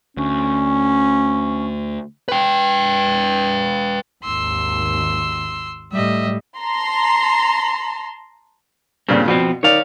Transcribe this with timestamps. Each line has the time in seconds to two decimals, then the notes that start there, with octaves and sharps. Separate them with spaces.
0.17 D2 C#4
2.28 B4 G5
4.24 G#1 D#2 C6 E6
5.92 A2 G3 D#5 E5
6.57 A5 A#5 C6
9.09 G2 A#2 C#3 C4
9.28 B2 F3 C4
9.63 D#3 C#5 D5 F5